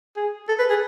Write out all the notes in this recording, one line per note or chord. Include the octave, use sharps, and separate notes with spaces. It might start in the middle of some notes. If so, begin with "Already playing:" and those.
G#4
A4
B4
G#4